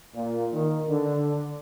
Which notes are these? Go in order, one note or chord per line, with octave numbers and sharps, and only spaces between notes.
A#2
D#3
D3